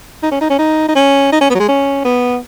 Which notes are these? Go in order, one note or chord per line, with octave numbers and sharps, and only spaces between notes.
D#4
C#4
D#4
C#4
D#4
D#4
C#4
D#4
C#4
B3
F#3
G#3
C#4
B3